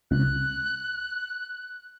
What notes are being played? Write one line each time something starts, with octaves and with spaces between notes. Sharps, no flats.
C#2 F#6